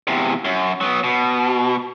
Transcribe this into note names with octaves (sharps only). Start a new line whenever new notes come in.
E2 C3
F#2
F#3 B3
B2